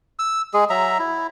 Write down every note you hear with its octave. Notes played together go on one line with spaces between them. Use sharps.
E6
G#3 G#4
F#3 E5 A#5
E4